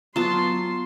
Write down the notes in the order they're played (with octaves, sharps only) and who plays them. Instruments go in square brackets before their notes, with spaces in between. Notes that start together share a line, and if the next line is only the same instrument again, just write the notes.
[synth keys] F#3 B3 [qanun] F4 A5 [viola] C6